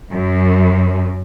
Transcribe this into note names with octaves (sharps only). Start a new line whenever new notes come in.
F#2